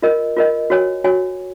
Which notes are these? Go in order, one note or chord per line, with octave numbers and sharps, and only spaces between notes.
F4 A#4 D#5
F4 A#4 D#5
F#4 C#5 G#5
F#4 C#5 G#5